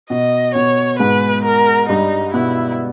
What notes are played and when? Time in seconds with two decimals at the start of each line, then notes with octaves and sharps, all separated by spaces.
0.10 B2 D#5
0.54 B2 C#5
0.99 G#2 G#3 B4
1.44 A#4
1.89 G2 G3 D#4
2.33 B2 B3 E4